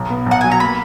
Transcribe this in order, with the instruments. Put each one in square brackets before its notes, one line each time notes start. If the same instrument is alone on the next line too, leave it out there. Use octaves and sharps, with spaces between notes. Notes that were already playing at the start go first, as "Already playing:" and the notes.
Already playing: [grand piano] B1
B3
[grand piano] B1 [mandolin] F#5
[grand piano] F#3 [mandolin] G#5
[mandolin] A#5
[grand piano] A#3 [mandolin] B5